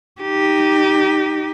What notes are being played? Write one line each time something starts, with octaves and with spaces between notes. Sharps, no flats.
D#4 G4